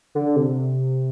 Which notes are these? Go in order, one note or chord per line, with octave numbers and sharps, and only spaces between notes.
D3
C3